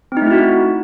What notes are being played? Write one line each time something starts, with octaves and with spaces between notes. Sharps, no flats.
A3 C4 D#4 E4 F#4